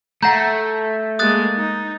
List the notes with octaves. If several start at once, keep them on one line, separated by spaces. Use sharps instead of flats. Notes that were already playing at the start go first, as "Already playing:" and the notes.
A3 F#5 A#5 G6 A#6
G#3 A#3 D#6 F#6 A6
D#4